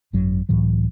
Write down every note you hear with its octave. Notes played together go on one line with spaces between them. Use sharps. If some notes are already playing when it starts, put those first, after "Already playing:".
G#1 F#2 F#3
C#2 A2 E3 F#3